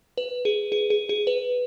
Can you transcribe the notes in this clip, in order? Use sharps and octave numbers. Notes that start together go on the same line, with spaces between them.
B4
G#4
G#4
G#4
G#4
B4